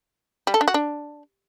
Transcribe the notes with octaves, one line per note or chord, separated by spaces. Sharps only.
G3
A4
D4
F#4
D4